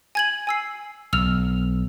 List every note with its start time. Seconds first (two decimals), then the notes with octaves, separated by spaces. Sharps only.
0.15 G#5 G#6 F#7
0.47 G#5 E6 C7
1.13 B1 E6 F6 F7